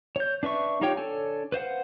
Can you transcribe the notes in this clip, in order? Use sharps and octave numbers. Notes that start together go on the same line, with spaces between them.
C#5 G6
D4 B4 E5 C#6
D#4 F4 G4 C#5 G5
D4 A4 C#5 G#5
B4 C5 F5 F#5